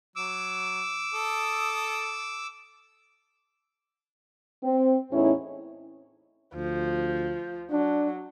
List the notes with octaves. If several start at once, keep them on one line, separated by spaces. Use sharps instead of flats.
F#3 D6 E6
A4 A5 D#6
C4
E2 A2 C#4 D#4 E4
D2 F3
F#3 D4